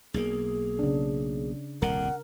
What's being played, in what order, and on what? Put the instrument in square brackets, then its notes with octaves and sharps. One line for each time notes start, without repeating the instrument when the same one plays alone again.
[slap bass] B1 A#3 [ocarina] G#4
[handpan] C#3 D4
[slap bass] D#1 C2 D3 [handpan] A#4 [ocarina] F#5